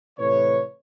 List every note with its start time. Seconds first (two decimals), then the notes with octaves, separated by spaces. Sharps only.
0.18 A2 C3 E3 B4 C#5